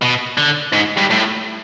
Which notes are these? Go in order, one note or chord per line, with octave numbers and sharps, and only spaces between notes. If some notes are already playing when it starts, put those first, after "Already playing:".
B2
D3
G#2
G2
A2